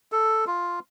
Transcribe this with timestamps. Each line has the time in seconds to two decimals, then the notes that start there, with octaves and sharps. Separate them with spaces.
0.12 A4
0.47 F4